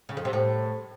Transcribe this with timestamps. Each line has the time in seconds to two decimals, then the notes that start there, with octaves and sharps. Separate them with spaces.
0.09 C#3
0.17 F2
0.25 C3
0.33 A2